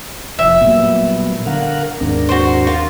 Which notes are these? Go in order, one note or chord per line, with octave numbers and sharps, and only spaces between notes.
F1 F3 E5
A#2 F#3 G3 B3
D3 A#4 F5 F#5
D#2 G#2 C4 D4 A#4
F#4 C5
F4